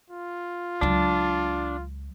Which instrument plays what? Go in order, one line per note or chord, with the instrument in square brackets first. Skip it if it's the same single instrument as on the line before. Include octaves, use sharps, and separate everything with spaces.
[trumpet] F4
[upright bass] C#2 F#3 [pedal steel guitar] D4